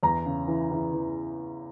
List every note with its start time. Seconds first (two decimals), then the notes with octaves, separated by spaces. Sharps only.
0.03 E2 A#5
0.25 C#3
0.48 E3
0.71 E3
0.93 E3